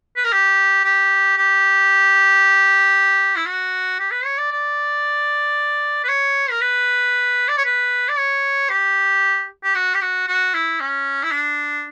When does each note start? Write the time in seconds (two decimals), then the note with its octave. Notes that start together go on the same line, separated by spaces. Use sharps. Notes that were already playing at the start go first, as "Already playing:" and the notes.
0.16 B4
0.24 A#4
0.32 G4
0.85 G4
1.37 G4
3.36 E4
3.46 F#4
3.99 G4
4.11 B4
4.25 C#5
4.38 D5
4.52 D5
6.04 B4
6.08 C#5
6.50 A#4
6.61 B4
7.48 D5
7.57 C#5
7.65 B4
8.09 D5
8.18 C#5
8.70 G4
9.63 G4
9.75 F#4
9.94 G4
10.02 F#4
10.28 F#4
10.54 E4
10.80 C#4
11.23 E4
11.32 D4